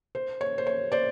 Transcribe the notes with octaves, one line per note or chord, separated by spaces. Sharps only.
C5
C#5
C5
C#5
C5 D5